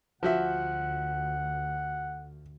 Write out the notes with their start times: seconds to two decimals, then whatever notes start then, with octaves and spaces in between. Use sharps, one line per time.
0.23 D2 F3 F#4 E5 F#5